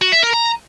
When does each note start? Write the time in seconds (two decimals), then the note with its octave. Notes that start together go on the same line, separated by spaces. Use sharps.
0.01 F#4
0.12 E5
0.23 A#4
0.33 A#5